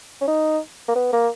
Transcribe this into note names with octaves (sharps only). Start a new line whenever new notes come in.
C#4
D#4
A#3
B3
A#3